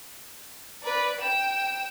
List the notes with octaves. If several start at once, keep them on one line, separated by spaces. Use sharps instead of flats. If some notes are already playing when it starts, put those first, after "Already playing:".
B4 D5
G5 E7